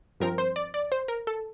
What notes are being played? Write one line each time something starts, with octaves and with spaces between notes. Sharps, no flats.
G2 F3 C4 A#4
C5
D5
D5
C5
A#4
A4